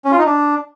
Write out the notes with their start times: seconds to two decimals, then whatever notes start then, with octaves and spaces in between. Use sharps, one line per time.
0.05 C#4
0.12 F4
0.19 D#4
0.26 D4